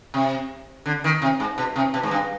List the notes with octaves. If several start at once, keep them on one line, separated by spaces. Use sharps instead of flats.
C3
D3
D#3
C3
G#2
B2
C3
B2
G#2
G2